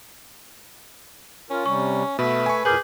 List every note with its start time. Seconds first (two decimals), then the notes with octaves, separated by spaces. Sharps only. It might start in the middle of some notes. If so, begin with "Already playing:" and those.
1.50 C#4 F4 A#4
1.66 C3 G3 C#6
2.19 B2 A3 B4 E5
2.46 G#5 C#6
2.65 E2 A#2 G#4 A#4 B4 D6 G6 F#7